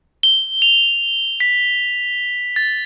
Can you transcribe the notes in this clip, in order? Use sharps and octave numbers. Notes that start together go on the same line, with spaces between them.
G7
F7
B6
A6